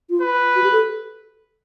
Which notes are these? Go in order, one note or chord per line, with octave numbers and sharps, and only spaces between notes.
F4
B4
F#4
G4
A4